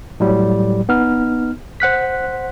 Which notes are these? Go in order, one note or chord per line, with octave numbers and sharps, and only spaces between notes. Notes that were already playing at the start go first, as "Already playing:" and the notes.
A2 F#3 G3
B3 D#4 F6
C5 F#5 F#6 B6